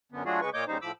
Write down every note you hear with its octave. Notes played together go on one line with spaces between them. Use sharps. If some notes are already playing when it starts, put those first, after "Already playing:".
F#2 D3 B3
F#3 A3 D4 F4 F#4 G#4
C#3 G#3 B4 C#6
A#2 A#3 C#5 D#5 D6 G6
D#2 C#3 G3 D#4 C5
A2 F3 B5 D6 E6